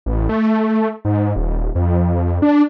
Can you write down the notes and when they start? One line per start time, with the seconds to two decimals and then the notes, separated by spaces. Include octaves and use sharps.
0.06 A1
0.29 A3
1.05 G#2
1.36 D#1
1.75 F2
2.42 D4